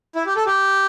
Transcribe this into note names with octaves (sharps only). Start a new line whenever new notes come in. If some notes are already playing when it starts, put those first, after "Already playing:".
E4
G4
A4
G4